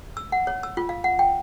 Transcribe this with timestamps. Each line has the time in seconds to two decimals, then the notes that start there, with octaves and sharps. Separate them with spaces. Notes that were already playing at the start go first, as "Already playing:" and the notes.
0.17 E6
0.32 F#5
0.47 C#5
0.63 E6
0.77 F4
0.89 F5
1.04 F#5
1.19 G5